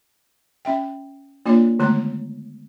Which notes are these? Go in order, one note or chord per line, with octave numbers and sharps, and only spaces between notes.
C#4 E5 G5
A#3 D4 F4 C#5 D5
D3 D#3 G#3 A3 B3 A#5